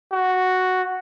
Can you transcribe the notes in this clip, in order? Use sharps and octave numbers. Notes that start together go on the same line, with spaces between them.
F#4